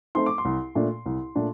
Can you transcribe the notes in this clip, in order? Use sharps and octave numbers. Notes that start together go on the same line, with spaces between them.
A3 C4 D#4 C6
D6
C6
C2
A#2 A3 D4
C2
A#2 A3 D4